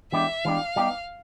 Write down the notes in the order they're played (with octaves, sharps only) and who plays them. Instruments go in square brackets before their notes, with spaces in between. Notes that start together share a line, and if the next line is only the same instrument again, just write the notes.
[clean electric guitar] E3 G#3 B3 D4 G4 [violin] E5
[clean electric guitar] E3 G#3 B3 D4 G4 [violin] F5
[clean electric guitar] G3 B3 D#4 G4